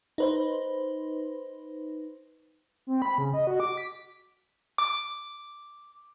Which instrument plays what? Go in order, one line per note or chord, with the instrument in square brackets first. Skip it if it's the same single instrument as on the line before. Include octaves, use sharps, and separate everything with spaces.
[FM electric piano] D#4 B4 C5
[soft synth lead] C4
B5
C#3
D#5
F#4
D6
B6
[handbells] D6